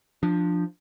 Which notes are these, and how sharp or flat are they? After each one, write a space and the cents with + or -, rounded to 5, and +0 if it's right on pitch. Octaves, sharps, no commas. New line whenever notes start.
F3 +0 D4 +15